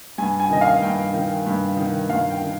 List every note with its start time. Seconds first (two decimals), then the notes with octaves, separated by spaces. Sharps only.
0.18 G2 G#5
0.40 G#5
0.50 D#3 D#5
0.61 F5
0.82 G2 G5
1.13 D#3
1.46 G2
1.77 D#3
2.09 G2 F5
2.30 G5
2.41 D#3